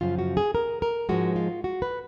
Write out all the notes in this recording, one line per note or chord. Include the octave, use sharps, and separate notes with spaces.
F#2 C#3 F3 F4
F#4
G#4
A#4
A#4
G#2 F3 G#3 F#4
F4
F#4
B4